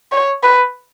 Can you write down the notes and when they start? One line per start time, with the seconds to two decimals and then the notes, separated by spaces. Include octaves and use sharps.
0.12 C#5
0.43 B4